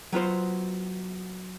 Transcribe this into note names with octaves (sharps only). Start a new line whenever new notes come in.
F#3 B3 F4 C5